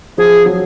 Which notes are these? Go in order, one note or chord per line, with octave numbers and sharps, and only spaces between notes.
F3 G#4
F#3